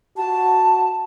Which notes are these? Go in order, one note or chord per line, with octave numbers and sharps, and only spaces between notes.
F#4 A5